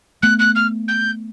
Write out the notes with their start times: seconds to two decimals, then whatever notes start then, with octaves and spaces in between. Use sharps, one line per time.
0.22 A3 B3 F#6
0.39 F#6
0.56 F6
0.88 G6